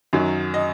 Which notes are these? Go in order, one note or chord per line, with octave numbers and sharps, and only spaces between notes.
F#2 D#3 F#3
D#5